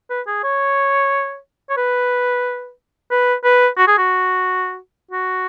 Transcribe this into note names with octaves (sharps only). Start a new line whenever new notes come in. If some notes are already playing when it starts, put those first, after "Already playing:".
B4
G#4
C#5
C#5
B4
B4
B4
F#4
G#4
F#4
F#4